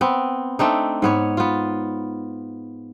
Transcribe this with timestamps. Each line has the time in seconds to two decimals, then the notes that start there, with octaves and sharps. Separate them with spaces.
0.01 B3 C4
0.59 A3 C4 D4 D#4
1.02 G#2 B3 C#5
1.37 B3 F4